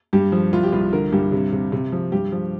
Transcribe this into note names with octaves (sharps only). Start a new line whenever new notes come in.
G2 G4
F3
C2 F4
G4
C2 F4
D3 A#4
G2 G4
C3
C3
C3
F3
G2 G4
F3